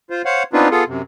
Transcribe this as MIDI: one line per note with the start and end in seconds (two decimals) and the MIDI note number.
0.10 0.22 65
0.10 0.22 72
0.25 0.43 72
0.25 0.43 73
0.25 0.43 77
0.25 0.43 78
0.53 0.68 59
0.53 0.68 60
0.53 0.68 62
0.53 0.68 63
0.53 0.68 65
0.53 0.68 71
0.71 0.84 59
0.71 0.84 65
0.71 0.84 68
0.71 0.84 69
0.88 1.02 42
0.88 1.02 48